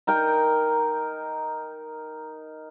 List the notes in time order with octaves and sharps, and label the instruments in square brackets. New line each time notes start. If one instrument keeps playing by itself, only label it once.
[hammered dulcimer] D#4 A#4 G5 A#5